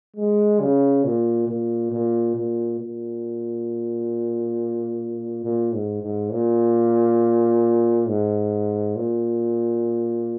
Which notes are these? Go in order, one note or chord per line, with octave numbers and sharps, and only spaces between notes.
G#3
C#3
A#2
A#2
A#2
A#2
A#2
A#2
G#2
G#2
A#2
G#2
A#2